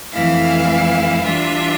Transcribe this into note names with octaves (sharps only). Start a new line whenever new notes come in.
F2 E3 A3 E4 F5
E3 G3 D4 F4 E5